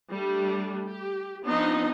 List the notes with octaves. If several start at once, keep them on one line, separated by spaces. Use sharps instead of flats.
G3 A3 D4
G4
F3 B3 C4 D4 D#4 D#5